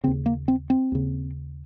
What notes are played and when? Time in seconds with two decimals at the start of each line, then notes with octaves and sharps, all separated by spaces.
0.04 C#3 C4
0.07 D#2
0.26 A#3
0.48 C4
0.70 C4
0.92 D#2 C#3